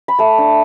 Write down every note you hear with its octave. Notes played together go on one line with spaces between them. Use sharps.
B5
A3 A5
D4